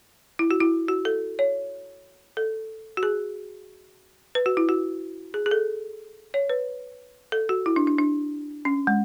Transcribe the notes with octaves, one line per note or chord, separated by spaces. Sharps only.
E4
F#4
E4
F#4
A4
C#5
A4
F#4
G#4
B4
F#4
E4
F#4
G#4
G#4
A4
C#5
B4
A4
F#4
E4
D4
D4
D4
C#4
G#3